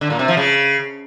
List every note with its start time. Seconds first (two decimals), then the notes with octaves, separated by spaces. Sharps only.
0.01 D3
0.10 A#2
0.19 C3
0.28 F3
0.37 C#3